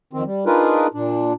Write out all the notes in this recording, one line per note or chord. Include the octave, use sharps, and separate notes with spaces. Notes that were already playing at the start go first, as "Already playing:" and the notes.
F2 D#3 C4
G3
D4 D#4 F4 G#4 A#4 B4
A#2 D4